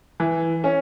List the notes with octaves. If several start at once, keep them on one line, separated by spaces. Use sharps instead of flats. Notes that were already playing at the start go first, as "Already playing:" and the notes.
E3
C#4